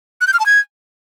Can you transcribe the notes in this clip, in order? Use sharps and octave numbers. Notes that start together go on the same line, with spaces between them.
F#6
G6
F6
A5
G#6